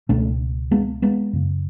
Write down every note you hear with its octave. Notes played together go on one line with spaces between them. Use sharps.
C#2 B2 A3 C#4
G#3 B3
G#3 B3
F#2 C#3